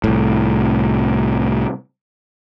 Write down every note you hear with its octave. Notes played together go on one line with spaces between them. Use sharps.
C2 A2